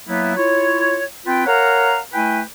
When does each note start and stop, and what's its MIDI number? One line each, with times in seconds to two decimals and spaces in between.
0.08 0.33 54
0.08 0.33 58
0.08 0.33 59
0.08 0.33 64
0.37 1.03 64
0.37 1.03 65
0.37 1.03 73
1.27 1.45 60
1.27 1.45 65
1.27 1.45 71
1.27 1.45 79
1.47 1.99 70
1.47 1.99 73
1.47 1.99 77
1.47 1.99 78
1.47 1.99 82
2.14 2.41 57
2.14 2.41 64
2.14 2.41 71
2.14 2.41 79
2.14 2.41 80